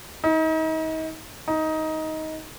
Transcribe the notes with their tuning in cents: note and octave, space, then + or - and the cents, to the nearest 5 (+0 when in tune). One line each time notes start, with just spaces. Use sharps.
D#4 +35
D#4 +15